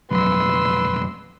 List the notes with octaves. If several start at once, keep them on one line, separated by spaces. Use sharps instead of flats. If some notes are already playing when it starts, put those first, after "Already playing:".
B1 F2 F#3 B4 C6 E6